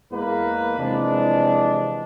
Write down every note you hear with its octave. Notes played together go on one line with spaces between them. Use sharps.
E2 G#3 A#3 B4
C3 E3 F3 G#3 D4